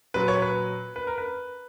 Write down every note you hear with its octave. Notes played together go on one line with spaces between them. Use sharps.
A#2 F#3 B4
C#5
B4
B4
A#4
B4